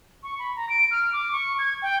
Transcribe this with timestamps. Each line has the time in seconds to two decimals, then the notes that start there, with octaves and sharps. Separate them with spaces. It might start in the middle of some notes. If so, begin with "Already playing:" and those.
0.23 C#6
0.39 B5
0.56 A#5
0.69 D7
0.91 F6
1.13 D6
1.32 C#6
1.59 G#6
1.82 G5